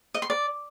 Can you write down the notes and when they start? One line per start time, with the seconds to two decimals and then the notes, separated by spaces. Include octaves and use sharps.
0.14 D#5
0.22 C6
0.30 D5